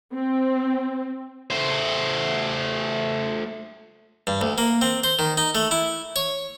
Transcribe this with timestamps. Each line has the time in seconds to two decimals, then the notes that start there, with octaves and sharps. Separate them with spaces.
0.14 C4
1.50 A3 C5
4.27 G2
4.41 D2
4.58 A#3
4.81 C4
5.04 C5
5.19 D#3
5.37 D#4
5.55 A3
5.71 E4
6.16 C#5